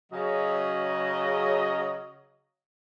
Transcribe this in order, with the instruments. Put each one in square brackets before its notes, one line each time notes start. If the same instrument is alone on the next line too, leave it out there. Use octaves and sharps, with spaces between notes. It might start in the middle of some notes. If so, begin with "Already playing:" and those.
[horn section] C#3 F#3 D#5